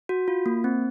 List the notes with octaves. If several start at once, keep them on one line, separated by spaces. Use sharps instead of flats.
F#4
F4
A#3
C4